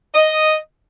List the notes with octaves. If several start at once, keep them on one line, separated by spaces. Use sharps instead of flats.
D#5